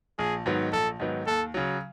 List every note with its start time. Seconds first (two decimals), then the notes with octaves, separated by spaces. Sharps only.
0.19 A#1 G#4
0.46 G#2 D#3 F#3 B3
0.73 A#1 A4
1.00 G#2 D#3 F#3 B3
1.27 D#2 A4
1.54 C#3 F#3